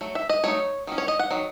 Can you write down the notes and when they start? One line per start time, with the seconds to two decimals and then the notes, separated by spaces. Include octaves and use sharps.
0.01 F#3 A3
0.15 E5
0.29 D#5
0.43 F#3 A3 D#4 C#5
0.87 D#3 F#3 C#4
0.98 C#5
1.08 D#5
1.19 F#5
1.30 D#3 F#3